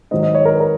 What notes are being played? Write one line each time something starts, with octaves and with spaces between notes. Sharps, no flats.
G#2 D#3 F#3 D#5
D#5
C#5
A#4
B4
A#4